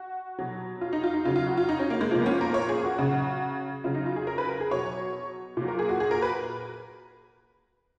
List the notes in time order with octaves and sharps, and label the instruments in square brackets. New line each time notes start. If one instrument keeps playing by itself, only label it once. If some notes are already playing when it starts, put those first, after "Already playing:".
Already playing: [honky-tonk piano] F#4
B2 F#3
F4
D#4
F4
D#4
C#3 F#3 F4
F4
F#4
F4
D#4
C#4
A#3
G#3
A#2 F3 A#3
B3
C#4
A#4
C#5
G#4
F#4
C#3 F#3
C#3 F#3 F4
D#4
F4
G#4
A#4
B4
A#4
G#4
B2 F#3 C#5
A#2 F#3
A#4
G#4
F#4
G#4
A#4
B4